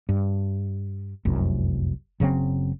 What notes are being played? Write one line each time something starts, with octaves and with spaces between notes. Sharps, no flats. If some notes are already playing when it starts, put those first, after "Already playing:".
G2
F1 C2 F#2
F#1 C#3 F#3 C4